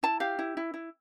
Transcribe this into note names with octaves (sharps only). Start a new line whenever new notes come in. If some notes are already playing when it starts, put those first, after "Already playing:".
E4 A5
G4 F5
E4
E4
E4